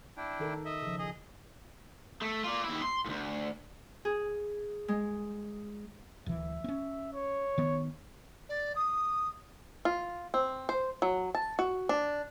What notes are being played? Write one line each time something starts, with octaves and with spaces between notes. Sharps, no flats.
D4 E4 G5
D#3 A4 A#4
D#5 E5
C#3 F3
G#4 D#5
A3
F4 D5
D#2 E4
C6
D2 G#2
G#4
G#3
D1 E3 E5
C4 C#4
C#5
D#3 B3
D5
D#6
F4
C4
C5
F#3
A5
F#4
D4